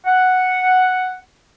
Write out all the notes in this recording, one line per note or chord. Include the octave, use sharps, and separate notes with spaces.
F#5